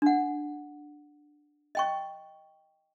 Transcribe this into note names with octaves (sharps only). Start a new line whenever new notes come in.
D4 F#5
D#5 G5 C#6